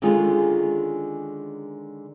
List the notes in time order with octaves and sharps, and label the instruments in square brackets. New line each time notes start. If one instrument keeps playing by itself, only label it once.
[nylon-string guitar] D3 D#3 G#3 C#4 F4 G#4